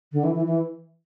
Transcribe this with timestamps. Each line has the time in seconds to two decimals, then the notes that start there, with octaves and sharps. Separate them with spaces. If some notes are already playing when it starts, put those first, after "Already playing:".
0.12 D3
0.24 E3
0.35 E3
0.46 E3